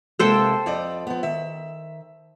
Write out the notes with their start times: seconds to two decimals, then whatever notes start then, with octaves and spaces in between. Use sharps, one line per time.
0.19 C3 G#3 A#3 A4 C5 G5
0.66 F2 D5 D#5
1.07 F3 B3
1.23 D#3 E5